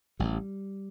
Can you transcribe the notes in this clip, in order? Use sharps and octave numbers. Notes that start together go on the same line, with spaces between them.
A1 G3